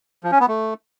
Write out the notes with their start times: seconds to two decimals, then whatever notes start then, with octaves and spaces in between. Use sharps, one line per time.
0.24 F3
0.32 C#4
0.40 B3
0.48 A3